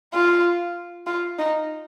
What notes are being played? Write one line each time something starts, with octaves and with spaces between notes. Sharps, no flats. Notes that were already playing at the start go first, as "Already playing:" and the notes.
F4
F4
D#4